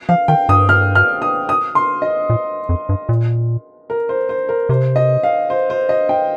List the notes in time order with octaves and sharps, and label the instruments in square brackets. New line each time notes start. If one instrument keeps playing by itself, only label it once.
[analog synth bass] F3 [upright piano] F5
[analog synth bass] D#3 [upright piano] G5
[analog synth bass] G2 [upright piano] D#6
[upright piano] F6
F6
D#6
D#6
C6
D#5
[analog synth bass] A#2
F2
G2
A#2
[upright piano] A#4
C5
C5
A#4
[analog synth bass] C3 [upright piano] C5
[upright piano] D#5
F5
C5
C5
D#5
G5